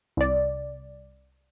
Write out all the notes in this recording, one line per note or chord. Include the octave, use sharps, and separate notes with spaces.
C2 D5